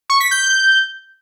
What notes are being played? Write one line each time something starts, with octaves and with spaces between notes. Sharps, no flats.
C#6
B6
G6